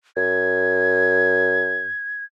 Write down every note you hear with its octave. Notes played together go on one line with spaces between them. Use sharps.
F#2 G#6